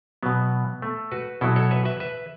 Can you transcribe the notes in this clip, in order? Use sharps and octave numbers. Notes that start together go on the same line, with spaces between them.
B2 F#3 B3
A3
F#4 B4
B2 F#3 E4 A4
A4 C#5
B4 E5
B4 E5
B4 E5